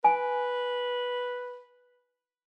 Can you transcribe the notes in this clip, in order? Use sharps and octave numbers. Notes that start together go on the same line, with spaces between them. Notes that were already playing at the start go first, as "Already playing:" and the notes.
B4 G#5